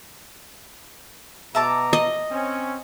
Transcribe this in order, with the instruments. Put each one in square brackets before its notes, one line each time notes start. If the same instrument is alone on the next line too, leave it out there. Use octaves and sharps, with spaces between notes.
[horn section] B2 A#5 [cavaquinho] E5 A5 D6
[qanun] D#5
[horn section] C4 C#4